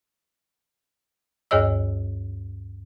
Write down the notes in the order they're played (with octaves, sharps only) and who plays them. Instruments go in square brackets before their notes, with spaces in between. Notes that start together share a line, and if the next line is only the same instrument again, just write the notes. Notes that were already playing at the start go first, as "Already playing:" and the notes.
[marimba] D2 G2 G#4 C#5 D#5 E6